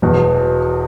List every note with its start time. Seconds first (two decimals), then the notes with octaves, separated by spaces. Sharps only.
0.02 E1 E2 B2